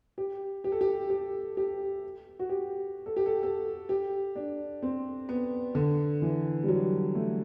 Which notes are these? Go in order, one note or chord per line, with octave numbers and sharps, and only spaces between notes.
G4
G4
A4
G4
G4
G4
F#4
G4
A4
G4
A4
A4
G4
D4
C4
B3
D3
E3
G3
F#3
A3